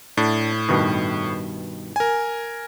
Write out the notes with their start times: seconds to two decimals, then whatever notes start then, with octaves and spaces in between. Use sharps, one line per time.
0.17 A2 D4
0.69 G2 B2 D#3
1.96 A#4 G#5